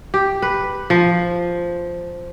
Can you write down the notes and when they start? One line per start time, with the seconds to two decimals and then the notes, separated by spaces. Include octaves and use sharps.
0.14 G4
0.42 B4
0.90 F3